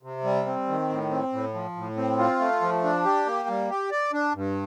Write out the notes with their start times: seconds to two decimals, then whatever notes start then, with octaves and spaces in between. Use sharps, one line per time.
0.03 C3
0.24 G3
0.46 C4
0.68 D#3
0.90 A2
1.11 C4
1.33 A2
1.54 F3
1.76 A2
1.97 C4
2.18 F4
2.40 A3
2.61 F3
2.84 D4
3.05 G4
3.26 A#3
3.49 G3
3.70 G4
3.91 D5
4.13 D4
4.35 G2